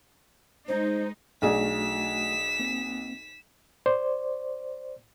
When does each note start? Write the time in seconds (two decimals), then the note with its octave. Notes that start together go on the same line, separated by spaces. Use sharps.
0.68 G#3 D#4 C5
1.42 B1 A3 D4 F#4 G#4 D5 B6 E7
2.59 A#3 C4
3.86 C5 D5